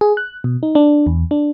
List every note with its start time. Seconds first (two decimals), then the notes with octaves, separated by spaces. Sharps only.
0.01 G#4
0.17 F#6
0.44 B2
0.63 D#4
0.75 D4
1.07 E2
1.31 D4